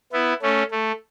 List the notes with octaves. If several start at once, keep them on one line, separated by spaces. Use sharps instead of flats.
B3 E4
A3 C#4
A3